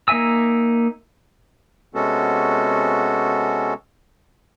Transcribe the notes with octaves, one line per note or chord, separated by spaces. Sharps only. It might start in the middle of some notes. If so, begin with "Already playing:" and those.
A#3 D#4 E5 G#5 E6
C3 G#3 B3 C#4 F#4 A4